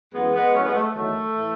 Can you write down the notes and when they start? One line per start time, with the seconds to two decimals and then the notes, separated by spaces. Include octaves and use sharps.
0.14 F#2 E3 G#3 B3
0.34 G#3 B3
0.54 A2 F#3 A3 C#4
0.65 G#3 B3
0.75 A3
0.95 E2 D#3 F#3 A3
1.36 A2 E3